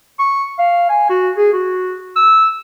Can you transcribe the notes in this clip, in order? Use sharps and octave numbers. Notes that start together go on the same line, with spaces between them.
C#6
F5
G#5
F#4
G#4
F#4
E6